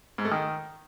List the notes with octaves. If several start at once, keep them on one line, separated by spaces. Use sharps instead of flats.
G#2
A3
D#3